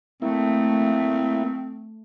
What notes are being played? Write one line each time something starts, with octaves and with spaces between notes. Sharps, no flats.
A3 A#3 C4 E4